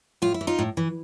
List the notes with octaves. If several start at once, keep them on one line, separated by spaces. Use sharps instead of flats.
A2 F4
E4
E3
D#4 F4
A2
E3